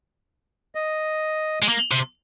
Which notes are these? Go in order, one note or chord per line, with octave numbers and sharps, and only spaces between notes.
D#5
G#3
A#3
C3